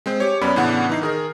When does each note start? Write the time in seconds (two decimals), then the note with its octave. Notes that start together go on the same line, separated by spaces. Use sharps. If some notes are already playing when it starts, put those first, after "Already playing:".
0.06 G#3 C4 C5
0.20 G4 C#5
0.41 F#2 B3 C#4 D5 B5
0.56 A2 C#3 E3 B3 D4 F#5
0.89 E3 D#4 C7
1.01 D#3 G#4 A#4